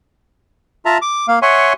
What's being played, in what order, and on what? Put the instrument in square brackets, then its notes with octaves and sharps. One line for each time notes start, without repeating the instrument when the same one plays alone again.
[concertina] F4 E5 A5 A#5
D6
A#3 F5
C#5 E5 F#5 G#5 C6 C#6